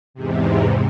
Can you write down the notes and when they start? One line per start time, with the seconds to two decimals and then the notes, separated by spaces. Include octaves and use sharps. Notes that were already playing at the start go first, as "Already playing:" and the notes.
0.14 E2 G#2 C3